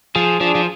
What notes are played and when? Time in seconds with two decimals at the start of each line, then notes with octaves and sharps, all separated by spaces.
0.16 F3 G#4
0.41 F3 D4
0.55 F3